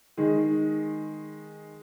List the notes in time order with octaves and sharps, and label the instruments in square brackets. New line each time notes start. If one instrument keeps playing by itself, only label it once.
[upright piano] D#3 G#3